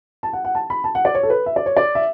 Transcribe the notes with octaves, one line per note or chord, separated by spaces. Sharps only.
A5
F#5
F#5
A5
B5
A5
F#5
D5
C#5
A4
B4
E5
D5
C#5
D5
E5